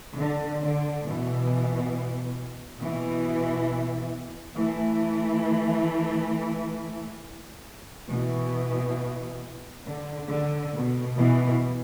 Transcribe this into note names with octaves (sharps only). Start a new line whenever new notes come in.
D3
D3
B2 E3
B2 E3
E3 A3
B2 E3
D3
D3
B2
B2 E3